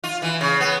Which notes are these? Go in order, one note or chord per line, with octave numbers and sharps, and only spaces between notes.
F4
E3
C#3
B3